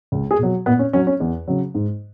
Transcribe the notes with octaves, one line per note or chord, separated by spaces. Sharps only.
C#2
G#4
B2 F#3
A#2 B3
C#4
F#3 C#4
C#4
E2
C#3 F#3
G#2